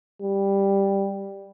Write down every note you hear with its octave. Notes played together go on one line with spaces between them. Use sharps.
G3